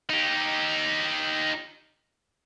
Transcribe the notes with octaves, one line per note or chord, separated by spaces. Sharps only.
D#4 G4